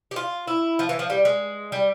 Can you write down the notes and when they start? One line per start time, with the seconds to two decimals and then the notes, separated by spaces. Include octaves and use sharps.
0.11 G4
0.16 F4
0.48 E4
0.79 F3
0.89 E3
0.99 F3
1.10 G3
1.25 G#3
1.72 G3